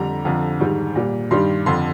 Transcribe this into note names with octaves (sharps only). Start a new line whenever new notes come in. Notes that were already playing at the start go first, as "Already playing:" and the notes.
Already playing: F2 D3 G3 A#5
F2 D3 F3
G#2 D#3 G3
A#2 G3
G2 D#3 G3 C6
F2 D3 F3 C6